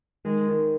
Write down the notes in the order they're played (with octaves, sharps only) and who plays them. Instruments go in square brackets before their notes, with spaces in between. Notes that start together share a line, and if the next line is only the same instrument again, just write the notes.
[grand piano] D#3 [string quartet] G#3
[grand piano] D#3